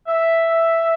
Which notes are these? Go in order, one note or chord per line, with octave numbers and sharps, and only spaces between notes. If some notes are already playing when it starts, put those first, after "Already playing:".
E5